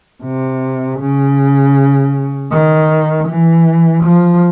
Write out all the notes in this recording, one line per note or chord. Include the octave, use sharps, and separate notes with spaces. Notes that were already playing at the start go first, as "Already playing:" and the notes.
C3
C#3
D#3
E3
F3